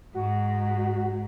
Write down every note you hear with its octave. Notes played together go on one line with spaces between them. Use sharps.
G#2 F#4